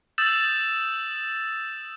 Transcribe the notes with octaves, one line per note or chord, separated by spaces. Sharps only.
D#6 E6 G6 A6 E7 F#7